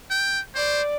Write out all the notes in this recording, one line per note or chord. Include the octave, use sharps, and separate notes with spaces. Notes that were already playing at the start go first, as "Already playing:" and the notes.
G5
C5 D5